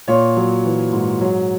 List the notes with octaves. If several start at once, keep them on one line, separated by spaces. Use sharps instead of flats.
A#2 C#5
F#3
E3
G#2
F#3